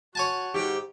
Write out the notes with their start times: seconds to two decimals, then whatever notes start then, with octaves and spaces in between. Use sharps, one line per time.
0.15 F#4 C#5 G#5 A5
0.54 G#2 G4